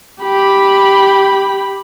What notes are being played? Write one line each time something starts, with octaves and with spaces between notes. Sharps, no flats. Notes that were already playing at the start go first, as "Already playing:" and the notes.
G4 B5